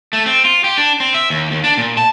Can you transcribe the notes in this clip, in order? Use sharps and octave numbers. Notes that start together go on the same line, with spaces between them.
A3
C4
F4
G4
D4
C4
E5
D#2
D#2
D4
A#2
A5